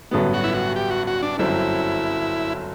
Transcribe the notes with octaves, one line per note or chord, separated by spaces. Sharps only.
A1 G2 D3 F#3 B3
F#4
E4
F#4
G4
F#4
F#4
D4
G1 F#2 F#3 C4 E4